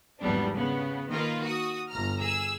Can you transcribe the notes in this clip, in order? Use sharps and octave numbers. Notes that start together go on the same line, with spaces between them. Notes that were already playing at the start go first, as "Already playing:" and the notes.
G#1 E2 F#3 G3 B3 D4
C#3 B3
D#3 A#3 F4 A#4 B4
F#4 D#6
G1 A#5 F6
G#4 E6